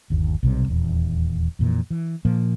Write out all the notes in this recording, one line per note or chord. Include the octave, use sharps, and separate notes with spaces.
G1 D#2
B1 C3 G3
D#1 E2
F2 A#2 E3
E3
A#2 F3 A#3